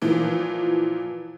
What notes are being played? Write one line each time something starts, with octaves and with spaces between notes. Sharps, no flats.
A#2 E3 F3